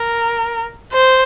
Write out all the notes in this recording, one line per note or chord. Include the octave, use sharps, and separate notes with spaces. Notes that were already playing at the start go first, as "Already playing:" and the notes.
Already playing: A#4
C5